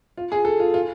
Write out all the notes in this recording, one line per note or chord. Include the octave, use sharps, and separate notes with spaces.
F4
G#4
A4
F4
F4